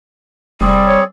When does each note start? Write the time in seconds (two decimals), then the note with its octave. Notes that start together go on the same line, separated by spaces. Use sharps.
0.61 F1 G3 C4 G#4 D5
0.87 C#5